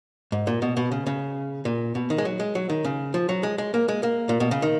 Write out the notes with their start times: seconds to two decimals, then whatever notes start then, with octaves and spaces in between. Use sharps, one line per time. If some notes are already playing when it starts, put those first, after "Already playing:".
0.32 G#2
0.47 A#2
0.62 B2
0.77 B2
0.92 C#3
1.06 C#3
1.65 A#2
1.95 B2
2.10 D#3
2.18 G#3
2.25 F#3
2.40 G#3
2.55 F#3
2.70 D#3
2.84 C#3
3.14 F3
3.29 F#3
3.43 G#3
3.58 G#3
3.74 A#3
3.88 G#3
4.03 A#3
4.29 A#2
4.40 B2
4.51 C#3
4.62 D#3